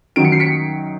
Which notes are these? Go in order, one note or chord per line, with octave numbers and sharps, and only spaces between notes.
F#2 D#3 F#3 D7
C#7
C7
B6 C#7